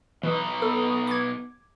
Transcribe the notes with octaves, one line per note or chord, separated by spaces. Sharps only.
B2 E3 D#4 B5 C#6 D#6
B3 A4
D6 G#6